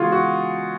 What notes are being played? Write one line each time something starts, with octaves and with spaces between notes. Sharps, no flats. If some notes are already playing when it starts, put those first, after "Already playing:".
Already playing: C#3 E3 G#3 B3 F4 F#4 G#4
F#4